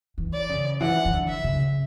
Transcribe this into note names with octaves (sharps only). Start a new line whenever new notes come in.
E3
D5
C#3
E3 F#5
E3
D3
E5
C#3